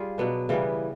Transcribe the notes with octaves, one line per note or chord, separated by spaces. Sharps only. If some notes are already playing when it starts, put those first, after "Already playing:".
Already playing: G3 F4 G#4
B2 F#3 B3 D4
C#3 E3 G3 B3